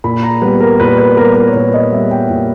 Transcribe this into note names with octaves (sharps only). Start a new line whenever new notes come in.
A#2 B5
A#5
G3 B3 B4
A#4
A#2 B4
B4
G3 B3 A#4
A#4
C#5
A#2 B4
D#5
G3 B3 E5
G5
A#2